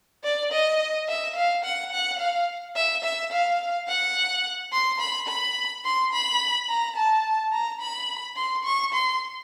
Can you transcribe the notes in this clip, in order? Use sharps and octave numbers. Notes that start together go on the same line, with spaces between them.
D5
D#5
E5
F5
F#5
F#5
F5
E5
E5
F5
F#5
C6
B5
B5
C6
B5
A#5
A5
A#5
B5
C6
C#6
C6